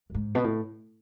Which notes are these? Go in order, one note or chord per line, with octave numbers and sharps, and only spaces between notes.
F#2
G#2
B2
A2